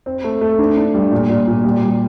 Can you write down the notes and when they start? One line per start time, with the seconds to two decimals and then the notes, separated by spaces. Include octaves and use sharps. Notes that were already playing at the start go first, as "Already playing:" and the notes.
0.06 C4
0.24 A3
0.41 A3
0.59 D4
0.77 D4
0.94 G3
1.12 A#2
1.29 A#2
1.47 A#2
1.64 G3
1.81 G3